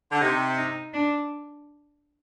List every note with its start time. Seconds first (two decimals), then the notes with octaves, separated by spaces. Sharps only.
0.12 D3
0.20 C3 D#4
0.57 D#4
0.94 D4